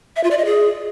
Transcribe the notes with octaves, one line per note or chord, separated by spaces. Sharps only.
E5
F4
D5
D#5
G#4